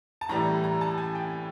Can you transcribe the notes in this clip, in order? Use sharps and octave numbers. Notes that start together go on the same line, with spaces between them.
A5
A2 E3 G3 A#5
A#5
A5
G#5
G5